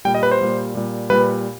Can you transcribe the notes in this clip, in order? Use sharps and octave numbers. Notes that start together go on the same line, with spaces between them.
A#2 G3 G5
D#5
B4
C5
A#2 G3
A#2 G3
A#2 G3 B4